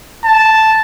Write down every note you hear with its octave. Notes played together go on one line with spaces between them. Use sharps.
A5